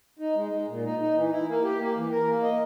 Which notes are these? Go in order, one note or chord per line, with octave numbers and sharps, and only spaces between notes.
D#4
G#3
G#3
A#2
D#4
D#4
E3
E4
A#3
G4
A#3
E3
A#4
A#3
D#5